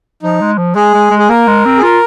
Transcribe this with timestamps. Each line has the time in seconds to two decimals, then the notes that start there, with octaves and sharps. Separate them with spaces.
0.23 F3 D#4
0.41 G#3
0.58 F3
0.75 G#3 G#4
0.94 G#3
1.11 G#3
1.19 G#4
1.29 A#3 A#4
1.47 G#3
1.65 C4
1.78 G#4
1.83 F4 A#4